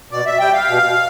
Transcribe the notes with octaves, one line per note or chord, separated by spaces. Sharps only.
B2 D5
E5
G3 G5
F5
B2